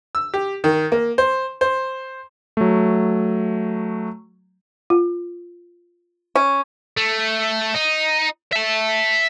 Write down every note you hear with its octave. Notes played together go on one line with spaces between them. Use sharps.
E6
G4
D#3
A#3
C5
C5
F#3 A3
F4
C#4
A3
D#4
E5 A5